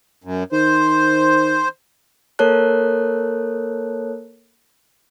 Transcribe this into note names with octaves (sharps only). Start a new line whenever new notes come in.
F#2
D#3 C5
A#3 A4 A#4 C#5 A5 F#6